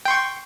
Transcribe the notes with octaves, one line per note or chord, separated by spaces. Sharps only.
G5 C6 C#6